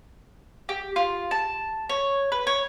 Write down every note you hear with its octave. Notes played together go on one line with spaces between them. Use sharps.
G4
F4
A5
C#5
B4
C#5